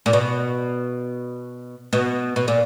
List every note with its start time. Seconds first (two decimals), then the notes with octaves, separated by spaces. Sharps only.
0.06 A#2
0.13 B2
1.93 B2
2.36 B2
2.48 A#2